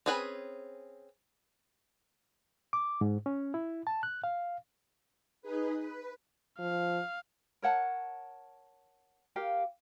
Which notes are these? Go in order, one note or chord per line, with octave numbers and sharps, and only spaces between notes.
C4 C#4 G#4 B4 B5
D6
G#2
C#4
E4
A5
F#6
F5
D#4 G#4 B4
B4
F3 F5
A#4 C#5 F#5 A5
G4 A#4 F5